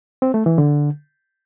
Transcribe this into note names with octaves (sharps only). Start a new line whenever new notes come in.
C4
A3
E3
D3